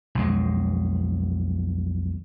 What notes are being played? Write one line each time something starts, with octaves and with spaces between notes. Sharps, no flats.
B1 F2 G#3